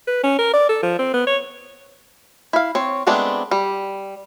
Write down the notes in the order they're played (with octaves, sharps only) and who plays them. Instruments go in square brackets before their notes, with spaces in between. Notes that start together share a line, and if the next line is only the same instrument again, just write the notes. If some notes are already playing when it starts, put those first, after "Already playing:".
[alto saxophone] B4
C#4
A#4
D5
A4
F3
C4
B3
C#5
[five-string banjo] E4 F5
C4 C#5
G#3 A3 B3 C4 D4
G3